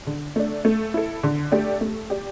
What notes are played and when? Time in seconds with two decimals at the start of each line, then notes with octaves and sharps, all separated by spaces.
0.07 D3
0.36 A3 D4
0.65 A3
0.94 E4 A4
1.23 D3
1.52 A3 D4 G4 D5
1.81 A3
2.10 G4 D5